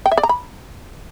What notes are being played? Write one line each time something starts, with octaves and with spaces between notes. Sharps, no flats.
G5
E5
D5
A#5
B5